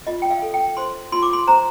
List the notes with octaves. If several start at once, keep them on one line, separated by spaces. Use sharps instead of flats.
F4 D#5
G5
F5
A4
G5
C5 C6
F4 C6
D6
C6
C5 A#5